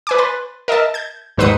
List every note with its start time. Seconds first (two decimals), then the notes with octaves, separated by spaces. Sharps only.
0.07 B4 G#5 D6
0.18 B4 C6 A6
0.68 A#4 D#5 E5 A5
0.94 G6 G#6
1.37 D#2 G#2 B4 C5 D#6 C#7